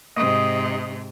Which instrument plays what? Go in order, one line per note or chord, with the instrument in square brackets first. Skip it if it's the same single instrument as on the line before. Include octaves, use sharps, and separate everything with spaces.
[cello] G#2 C3 [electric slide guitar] D#5